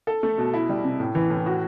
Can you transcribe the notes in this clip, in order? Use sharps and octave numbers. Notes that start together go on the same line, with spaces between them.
A4
A3
B2
E4
G3
C3
A2
E3
A2
F#4